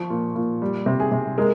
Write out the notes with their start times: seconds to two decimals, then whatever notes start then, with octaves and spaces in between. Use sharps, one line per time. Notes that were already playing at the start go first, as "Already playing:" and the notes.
Already playing: F3 C#6
0.10 A#2
0.36 A#2
0.62 G3
0.86 C3
1.00 G#4
1.12 C3
1.38 G#3 A#4